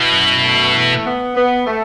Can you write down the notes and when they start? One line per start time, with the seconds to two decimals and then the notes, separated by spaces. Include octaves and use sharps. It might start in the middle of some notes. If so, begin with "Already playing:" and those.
Already playing: B2 E4
0.10 F#2
0.41 A3
0.73 E3
1.04 B3
1.35 B3
1.66 A3